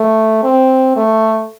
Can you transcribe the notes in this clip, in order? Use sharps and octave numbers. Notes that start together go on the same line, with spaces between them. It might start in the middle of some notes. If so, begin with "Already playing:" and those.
Already playing: A3
C4
A3